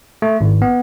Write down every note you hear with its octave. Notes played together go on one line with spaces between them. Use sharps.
A3
G#1
B3